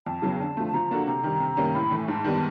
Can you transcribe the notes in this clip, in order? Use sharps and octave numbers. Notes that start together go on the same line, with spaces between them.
F2 A5
C#3 F#3 B3
D3 A5
F3 A3
A5
F3 A#5
A#3 D4 F#4 A4
C3 A#5
D#3 G3
C3
D#3 G3 A#3 C#4
A2 B5
E3 A3
G#5
G#2 A5
D#3 G3 B3